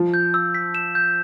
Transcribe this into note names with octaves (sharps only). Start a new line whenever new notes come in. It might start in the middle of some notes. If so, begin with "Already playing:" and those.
Already playing: F3
G6
E6
B6
E7
G6